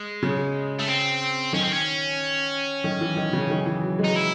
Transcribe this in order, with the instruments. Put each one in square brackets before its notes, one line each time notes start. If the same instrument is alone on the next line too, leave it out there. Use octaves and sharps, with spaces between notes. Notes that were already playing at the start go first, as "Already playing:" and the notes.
Already playing: [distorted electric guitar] G#3
[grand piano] C#3
[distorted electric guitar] A3
C4
[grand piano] D#3 [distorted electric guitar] C#4
[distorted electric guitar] C4
C#4
[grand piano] D#3
E3
D#3
C#3
D#3
E3
F#3
G#3
[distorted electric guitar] D#4
E4